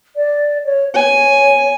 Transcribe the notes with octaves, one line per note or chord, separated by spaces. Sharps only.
D5
C#5
C#5 G#5